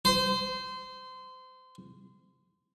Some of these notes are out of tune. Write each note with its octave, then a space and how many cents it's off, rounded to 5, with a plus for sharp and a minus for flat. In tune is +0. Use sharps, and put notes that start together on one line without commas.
C5 -25